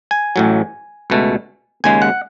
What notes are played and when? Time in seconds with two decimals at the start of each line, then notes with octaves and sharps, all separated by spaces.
0.11 G#5
0.36 A1 A2 F#3
1.10 C#2 B2 A3
1.84 D#2 C#3 G#3 G#5
2.02 F#5